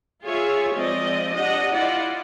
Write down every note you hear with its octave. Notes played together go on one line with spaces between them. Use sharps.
F4 G#4 C#5 E5
F3 G#3 C4 D5 D#5
D4 G4 D#5 F#5
E4 F4 D5 F#5